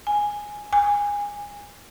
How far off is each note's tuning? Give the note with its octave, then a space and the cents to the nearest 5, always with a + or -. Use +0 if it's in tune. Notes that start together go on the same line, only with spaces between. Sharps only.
G#5 -5
G#5 -20